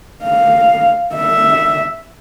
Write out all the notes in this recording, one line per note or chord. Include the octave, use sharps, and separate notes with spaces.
F5
E5